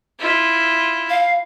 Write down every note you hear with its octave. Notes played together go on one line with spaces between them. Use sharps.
E4 F4
F5